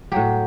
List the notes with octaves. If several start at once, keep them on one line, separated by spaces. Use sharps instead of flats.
A2 F#3 G4